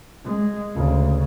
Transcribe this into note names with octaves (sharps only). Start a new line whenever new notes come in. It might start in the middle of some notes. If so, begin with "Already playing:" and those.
G#3
D2 C#3